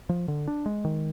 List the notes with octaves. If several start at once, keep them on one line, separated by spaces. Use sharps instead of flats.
F3
D3
D4
G#3
D#3